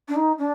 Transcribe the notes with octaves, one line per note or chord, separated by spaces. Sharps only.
D4
D#4
D4